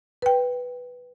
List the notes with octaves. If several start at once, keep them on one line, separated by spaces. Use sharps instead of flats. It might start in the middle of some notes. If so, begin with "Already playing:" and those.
B4 G5